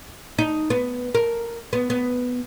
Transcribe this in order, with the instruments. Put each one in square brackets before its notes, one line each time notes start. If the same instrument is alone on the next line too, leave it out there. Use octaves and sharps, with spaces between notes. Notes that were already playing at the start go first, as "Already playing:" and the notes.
[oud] D#4
B3
A#4
B3
B3